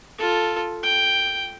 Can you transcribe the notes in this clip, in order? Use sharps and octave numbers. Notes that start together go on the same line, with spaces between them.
F4 A4
G5